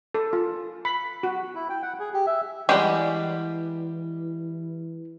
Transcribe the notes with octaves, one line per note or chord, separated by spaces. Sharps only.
A4
F4
B5
F#4
E4
G5
F#5
G#4
G4
E5
E3 G3 G#3 G4 F#5